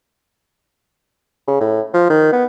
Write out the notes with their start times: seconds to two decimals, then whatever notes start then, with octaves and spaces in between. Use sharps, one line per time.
1.48 C#3
1.61 A2
1.94 F3
2.10 D#3
2.33 B3